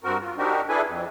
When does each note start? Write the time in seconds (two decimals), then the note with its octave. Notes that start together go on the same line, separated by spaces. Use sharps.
0.04 G2 C4 F#4 A#4
0.21 F4
0.37 C4 D4 D#4 F#4 G4 A#4
0.69 D4 E4 G#4 A4 B4 G#5
0.87 F2